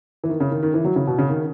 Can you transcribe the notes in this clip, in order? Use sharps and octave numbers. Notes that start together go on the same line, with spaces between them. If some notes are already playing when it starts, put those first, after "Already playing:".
E3
D#3
C#3
D#3
D#3
E3
F#3
C#3
B2
C#3
D#3